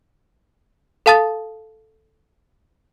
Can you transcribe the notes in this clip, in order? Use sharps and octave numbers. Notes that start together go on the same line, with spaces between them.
A4 F5 A5 D#6 A6